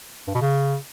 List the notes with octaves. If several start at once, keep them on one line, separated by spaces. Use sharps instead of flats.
G2
B2
C#3